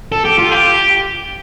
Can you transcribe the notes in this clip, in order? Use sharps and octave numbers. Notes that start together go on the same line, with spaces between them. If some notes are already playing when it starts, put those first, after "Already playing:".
A4
G4
F4
G4